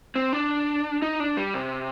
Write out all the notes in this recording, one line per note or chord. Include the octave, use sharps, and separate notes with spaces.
C4
D4
D#4
D4
G3
C3